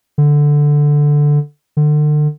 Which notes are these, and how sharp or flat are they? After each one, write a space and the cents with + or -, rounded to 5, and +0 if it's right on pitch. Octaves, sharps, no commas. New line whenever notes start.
D3 +0
D3 +35